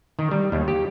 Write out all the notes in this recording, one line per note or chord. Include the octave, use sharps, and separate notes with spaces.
D#3
G3
D#2
G4